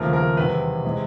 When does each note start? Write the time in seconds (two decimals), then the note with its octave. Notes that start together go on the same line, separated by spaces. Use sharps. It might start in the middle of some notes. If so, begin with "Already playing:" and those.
Already playing: D#2 C#3 F3 A3 A#4
0.13 A#4
0.37 E2 C3 D#3 G3 B4
0.85 C3 E3 G#3